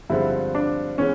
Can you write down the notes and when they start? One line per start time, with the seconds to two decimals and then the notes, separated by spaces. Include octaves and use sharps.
0.10 G2 D3 F3 G#3 C4 E4
0.55 D4
0.98 E3 G#3 B3 C#4